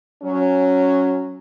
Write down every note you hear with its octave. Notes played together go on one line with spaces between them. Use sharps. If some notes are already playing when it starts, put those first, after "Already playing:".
F#3 C#4